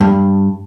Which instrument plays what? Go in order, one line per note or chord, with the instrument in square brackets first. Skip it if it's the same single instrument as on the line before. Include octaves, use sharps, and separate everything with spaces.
[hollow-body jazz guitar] G2